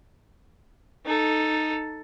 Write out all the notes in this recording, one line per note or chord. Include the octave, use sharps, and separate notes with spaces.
D#4 A4